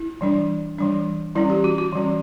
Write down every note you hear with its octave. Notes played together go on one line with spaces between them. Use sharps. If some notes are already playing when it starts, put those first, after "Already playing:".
Already playing: E4
E3 G3 D4
E3 G3 D4
E3 G3 C#4 E4
G4
F#4
F#4
E3 G3 C#4